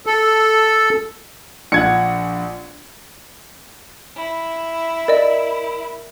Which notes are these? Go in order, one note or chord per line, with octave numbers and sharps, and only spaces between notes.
A4
A#1 F#5 G#6 C#7
E4
A#4 D5 D#5